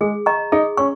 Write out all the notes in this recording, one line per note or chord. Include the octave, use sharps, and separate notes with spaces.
G#3 G#4
D#5 A#5 C#6
D#4 G#4
C#4 C#6